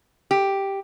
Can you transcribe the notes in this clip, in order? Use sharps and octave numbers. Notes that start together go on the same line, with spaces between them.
G4